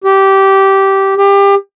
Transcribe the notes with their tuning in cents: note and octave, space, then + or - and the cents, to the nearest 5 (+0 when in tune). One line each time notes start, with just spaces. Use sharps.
G4 -15
G4 +25